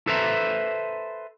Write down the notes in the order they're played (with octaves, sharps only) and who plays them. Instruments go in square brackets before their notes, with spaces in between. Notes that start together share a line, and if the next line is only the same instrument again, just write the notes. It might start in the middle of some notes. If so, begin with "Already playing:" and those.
[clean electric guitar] A4 B4 C5 E5 A#5